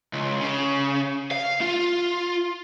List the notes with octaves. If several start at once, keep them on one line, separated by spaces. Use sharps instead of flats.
C#2
C#3
F5
F4